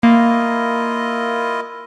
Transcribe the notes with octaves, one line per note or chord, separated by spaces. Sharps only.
A#3 E4 F4 D#5